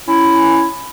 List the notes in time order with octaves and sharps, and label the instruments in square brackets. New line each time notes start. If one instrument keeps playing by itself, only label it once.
[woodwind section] C#4 E4